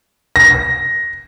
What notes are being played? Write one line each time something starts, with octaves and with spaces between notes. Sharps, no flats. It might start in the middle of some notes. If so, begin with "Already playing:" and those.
A#6